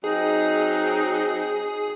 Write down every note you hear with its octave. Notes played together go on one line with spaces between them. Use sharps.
F#3 C4 D#4 G#4